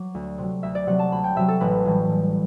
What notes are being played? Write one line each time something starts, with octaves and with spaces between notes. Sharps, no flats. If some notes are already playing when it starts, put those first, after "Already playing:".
Already playing: F#3 D6
D2
C3 F#3
D2 E5
D5
C3 F#3 F#5
A5
D2 B5
G5
C3 F#3 E5
A4
A1 B4
A2 E3 G3
A1